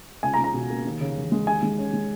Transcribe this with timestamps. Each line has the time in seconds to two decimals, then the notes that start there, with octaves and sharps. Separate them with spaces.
0.23 C#2 G#5
0.34 A#5
0.38 C#2
0.44 A#5
0.54 B2
0.70 A#3
0.85 D#2
1.01 C#3
1.17 E1
1.32 G#3
1.47 D#2 G#5
1.63 G#3
1.78 C#4
1.93 G#3